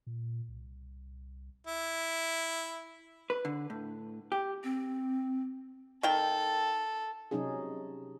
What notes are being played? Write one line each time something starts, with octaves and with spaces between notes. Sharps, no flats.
A#2
C2
E4
B4
D3
A2
G4
C4
D#3 A4 G5
C3 F#3 C#4 D#4 G#4